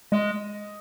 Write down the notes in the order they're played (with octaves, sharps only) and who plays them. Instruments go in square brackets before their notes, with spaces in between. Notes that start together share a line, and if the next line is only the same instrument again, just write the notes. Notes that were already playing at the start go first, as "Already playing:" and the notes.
[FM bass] G#3 [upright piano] D#5